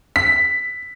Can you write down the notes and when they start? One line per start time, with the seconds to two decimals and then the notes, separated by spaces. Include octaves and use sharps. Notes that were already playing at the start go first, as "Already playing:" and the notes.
0.16 B6